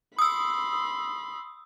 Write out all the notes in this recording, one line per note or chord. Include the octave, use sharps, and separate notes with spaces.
B5 C6 D#6 E6